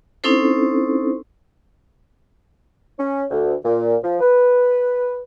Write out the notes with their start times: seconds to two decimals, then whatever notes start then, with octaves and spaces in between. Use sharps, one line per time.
0.24 C4 C#4 D#4 E4 A4 C5
2.98 C#4
3.31 D2
3.64 A#2
4.03 F3
4.19 B4